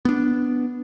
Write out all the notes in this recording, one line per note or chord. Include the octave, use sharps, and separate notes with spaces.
B3 D4